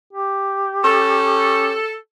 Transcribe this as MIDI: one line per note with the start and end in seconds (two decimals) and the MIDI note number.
0.13 1.79 67
0.84 1.77 61
0.84 1.94 69